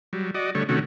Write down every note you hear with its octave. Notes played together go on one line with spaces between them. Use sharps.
F#3 G3
F#4 D5 D#5
D3 G3 A3 C#5
C3 D#3 A3 C#4 F#4